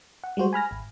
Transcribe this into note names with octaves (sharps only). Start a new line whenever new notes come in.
F#5
G3 G#3 F#4 C5
G#5 B5 F6 A#6
G#1